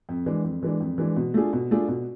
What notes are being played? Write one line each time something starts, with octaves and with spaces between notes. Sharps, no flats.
F2
E3 G#3 D4
F2
E3 G#3 D4
F2
E3 G#3 D4
B2
A3 D4 F4 G#4
B2
A3 D4 F4 G#4
B2